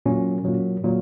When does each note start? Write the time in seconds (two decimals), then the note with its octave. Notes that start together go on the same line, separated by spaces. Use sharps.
0.06 A#2 F#3 C#4
0.45 A#2 F#3
0.84 A#2 F#3